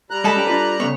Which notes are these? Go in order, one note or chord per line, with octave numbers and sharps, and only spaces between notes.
G3 A#5 F#6
G#3 A4 A5 B5
C#4 G4
D4 F4 B4
C#3 A3 B3 C#5